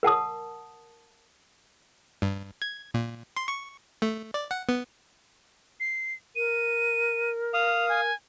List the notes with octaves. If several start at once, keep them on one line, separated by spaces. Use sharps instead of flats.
A#4 F#5 A5 D#6
G2
G#6
A#2
C6
C#6
A3
D5
F#5
B3
C7
A#4 D#7
F5 D#6 F7
G#5